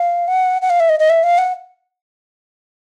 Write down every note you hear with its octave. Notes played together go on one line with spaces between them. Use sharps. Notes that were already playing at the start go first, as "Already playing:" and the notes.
Already playing: F5
F#5
F#5
F5
E5
D#5
D#5
E5
F5
F#5